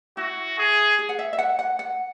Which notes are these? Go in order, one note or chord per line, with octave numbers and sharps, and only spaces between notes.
E4 F#4
G#4
G#4
F#5
E5
E5
F#5
F#5
F#5